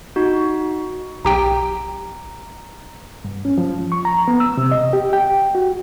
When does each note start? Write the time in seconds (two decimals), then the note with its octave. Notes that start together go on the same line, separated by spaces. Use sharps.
0.16 D#4 F#4
1.25 B1 G4 G5 A#5
3.25 G2
3.45 C#4
3.58 F3
3.92 C#6
4.05 A#5
4.28 B3
4.40 E6
4.57 C3
4.71 D#5
4.93 G4
5.13 G5
5.55 F#4